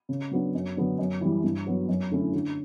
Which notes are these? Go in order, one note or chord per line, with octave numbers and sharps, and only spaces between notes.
C#3
F#3 B3 D4
F#2
D3 F#3 B3 D4
F#2
E3 G3
G2
F#3 B3
F#2
D3 A3 C#4 E4
D3